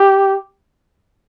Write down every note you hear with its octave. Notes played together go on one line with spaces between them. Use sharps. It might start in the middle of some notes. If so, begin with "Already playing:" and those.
Already playing: G4